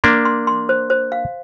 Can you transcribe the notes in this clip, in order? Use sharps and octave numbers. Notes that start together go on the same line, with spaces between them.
A#3 D4 C6
C6
C6
C5
C5
F5